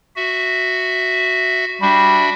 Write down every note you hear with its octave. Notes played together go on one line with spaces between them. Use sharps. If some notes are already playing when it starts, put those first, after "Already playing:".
F#4 E5
G3 D4 F#4 E5